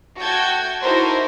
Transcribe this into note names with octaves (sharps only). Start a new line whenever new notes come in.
A3 F#4 G5 A5 G6 G#6
D#4 E4 F#4 A4 A#4 C5